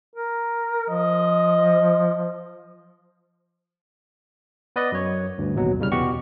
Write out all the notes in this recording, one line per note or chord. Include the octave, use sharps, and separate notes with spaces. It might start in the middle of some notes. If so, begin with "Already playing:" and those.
A#4
F3 D#5
B3 B4 D5 D#5
F#2 C#5
D2 G2
A1 D#2 B2 F#3
C2 C#3 G3 F6
E2 B2 F#4 G4 C#6